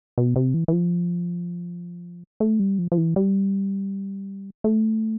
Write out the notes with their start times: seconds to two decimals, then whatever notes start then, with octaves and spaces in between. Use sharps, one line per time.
0.18 B2
0.36 C3
0.54 E3
0.68 E3
0.73 F3
2.40 A3
2.59 G3
2.78 F3
2.92 F3
2.98 E3
3.16 G3
4.64 A3